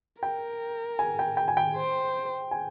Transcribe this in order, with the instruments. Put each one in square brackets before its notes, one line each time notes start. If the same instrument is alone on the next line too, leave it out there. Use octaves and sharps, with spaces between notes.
[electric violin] A#4 [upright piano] G5
[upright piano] G#5
G5
G5
G#5
G5
[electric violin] C5
[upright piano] G#5